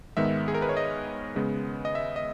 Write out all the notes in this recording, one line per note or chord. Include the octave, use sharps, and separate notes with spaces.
G#2 D#3 G#3 B3 E5
G#4
A#4
B4
C#5
D#5
C#3 G#3 B3
D#5
E5
D#5